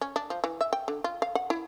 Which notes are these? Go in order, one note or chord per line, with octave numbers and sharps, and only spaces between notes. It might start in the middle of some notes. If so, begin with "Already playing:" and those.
C#4
D4
F3
E3
E5
G5
D3
F4
F5
F#5
E4